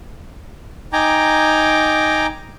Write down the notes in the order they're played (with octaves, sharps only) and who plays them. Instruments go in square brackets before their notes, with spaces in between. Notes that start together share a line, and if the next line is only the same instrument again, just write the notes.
[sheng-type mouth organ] D#4 G5 G#5 A#5 D6